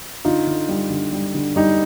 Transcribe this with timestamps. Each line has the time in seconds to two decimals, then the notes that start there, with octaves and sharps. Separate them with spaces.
0.25 D3 D#4 F4
0.47 D3
0.69 G3
0.90 D3
1.13 G3
1.35 D3
1.56 G3 D#4